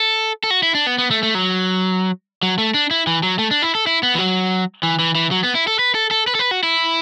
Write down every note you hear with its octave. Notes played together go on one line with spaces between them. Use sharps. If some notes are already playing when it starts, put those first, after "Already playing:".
Already playing: A4
A4
F#4
E4
D4
B3
B3
A3
A3
F#3
F#3
A3
D4
E4
E3
F#3
A3
D4
E4
A4
E4
B3
E3
F#3
E3
E3
E3
F#3
B3
E4
A4
B4
A4
A4
B4
A4
B4
F#4
E4